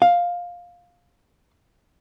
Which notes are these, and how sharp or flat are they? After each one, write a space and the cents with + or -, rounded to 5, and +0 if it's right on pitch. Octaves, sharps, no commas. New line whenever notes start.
F5 +10